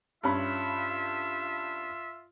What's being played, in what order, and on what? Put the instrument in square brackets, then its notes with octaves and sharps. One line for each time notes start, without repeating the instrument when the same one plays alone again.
[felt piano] G2 C#4 B5 [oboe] F4 [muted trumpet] E5